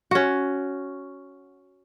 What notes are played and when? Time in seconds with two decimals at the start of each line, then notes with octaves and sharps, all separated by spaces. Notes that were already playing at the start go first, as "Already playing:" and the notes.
0.11 C#4 F#4